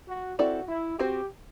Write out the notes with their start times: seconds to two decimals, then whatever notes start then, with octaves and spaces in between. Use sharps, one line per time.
0.08 F#4
0.38 C4 E4 F#4 A4 D5
0.69 E4
0.99 C4 F#4 G4 C5